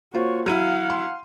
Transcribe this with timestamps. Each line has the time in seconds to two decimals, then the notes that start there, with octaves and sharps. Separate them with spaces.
0.14 A#3 F4 F#4 C5 C#5
0.46 F#3 E4 F5 F#5 F6 D#7
0.90 C6